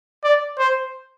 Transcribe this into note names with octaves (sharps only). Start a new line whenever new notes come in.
D5
C5